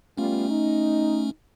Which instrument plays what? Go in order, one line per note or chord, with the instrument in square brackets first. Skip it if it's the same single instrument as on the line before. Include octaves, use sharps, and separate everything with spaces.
[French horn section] G3 B3 F4 [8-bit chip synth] A3 C#4
[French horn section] D#4